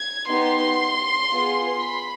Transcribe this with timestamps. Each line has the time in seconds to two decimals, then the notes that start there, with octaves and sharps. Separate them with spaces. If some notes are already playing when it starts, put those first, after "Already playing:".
Already playing: G#6
0.28 B3 D#4 G4 C6
1.31 B3 F4 G#4
1.81 B5